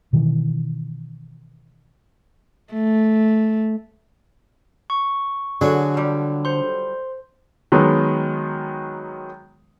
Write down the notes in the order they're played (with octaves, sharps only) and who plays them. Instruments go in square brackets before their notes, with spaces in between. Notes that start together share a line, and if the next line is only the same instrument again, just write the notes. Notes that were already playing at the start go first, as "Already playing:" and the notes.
[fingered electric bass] B2 D#3 E3
[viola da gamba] A3
[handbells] C#6
[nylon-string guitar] D3 [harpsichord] F#3 D4 [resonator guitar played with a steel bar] F#4 G#4
[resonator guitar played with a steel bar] F3 G3
[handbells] C5 C6
[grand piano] D#3 F#3 G#3 B3